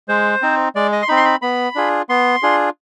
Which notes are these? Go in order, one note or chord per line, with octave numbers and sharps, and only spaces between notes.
G#3 C5
C4 D#4
G#3 D5
D#5
C6
C4 D#4 B5
C6
B5
B3 B5
D4 F4 G#4
B3 C6
D4 F4 G#4